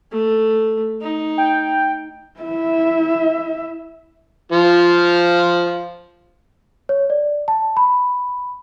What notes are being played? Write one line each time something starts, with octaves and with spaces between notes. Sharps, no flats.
A3
D#4
G5
E4 E5
F3 F4
C#5
D5
A5
B5